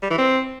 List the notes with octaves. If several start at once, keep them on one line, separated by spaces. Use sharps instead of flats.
G3
E3
C4